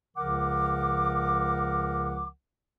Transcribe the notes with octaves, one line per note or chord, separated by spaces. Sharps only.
C#2 C#3 F3 A#4 F#5 D6